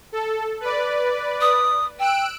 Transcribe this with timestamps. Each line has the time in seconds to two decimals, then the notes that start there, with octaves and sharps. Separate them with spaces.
0.12 A4
0.61 B4 D5
1.41 D#6
1.99 G5 E6 F#6 D7